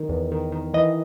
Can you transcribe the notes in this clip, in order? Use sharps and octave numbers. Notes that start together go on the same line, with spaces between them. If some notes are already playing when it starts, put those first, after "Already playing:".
Already playing: D#3
E2
D#3
D#3
E3 D#5